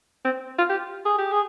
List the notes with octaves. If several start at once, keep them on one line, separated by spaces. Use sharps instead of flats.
C4
F4
G4
G#4
G4
G#4